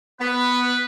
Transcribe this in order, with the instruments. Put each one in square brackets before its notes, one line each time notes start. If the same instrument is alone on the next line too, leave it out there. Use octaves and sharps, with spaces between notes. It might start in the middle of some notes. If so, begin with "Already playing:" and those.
[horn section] B3 [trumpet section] B4